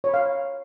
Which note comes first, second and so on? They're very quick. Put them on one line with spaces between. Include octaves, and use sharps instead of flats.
C#5 B5 F5